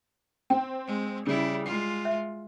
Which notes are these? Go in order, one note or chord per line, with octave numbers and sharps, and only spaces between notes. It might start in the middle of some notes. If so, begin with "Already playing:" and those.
C4 G5
G#3
C#3 G3 E4
G#3 F4 C7
E5